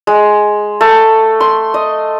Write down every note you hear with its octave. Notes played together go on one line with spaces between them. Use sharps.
G#3
A3
C6
D#5